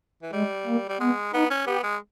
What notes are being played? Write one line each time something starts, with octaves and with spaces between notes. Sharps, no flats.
E3
G3 G#3
A#3
G3
G#3 B3
B3 D#4
C#4
B3 G4
G#3